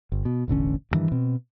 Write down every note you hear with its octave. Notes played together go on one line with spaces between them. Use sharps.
G1
B2
E1 A1 D3 C#4
D2 G2 D#3 E3
B2 C4